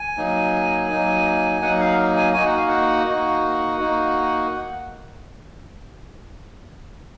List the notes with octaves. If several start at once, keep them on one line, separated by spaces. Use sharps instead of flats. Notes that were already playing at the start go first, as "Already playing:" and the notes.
Already playing: G#5
F#3 A#3 D#4
F#3 A#3 D#4
F#3 A#3 D#4 F#5
F5
G#5
A#3 D#4 F#4 G#5
F#5
F5
F#5
A#3 D#4 F#4
A#3 D#4 F#4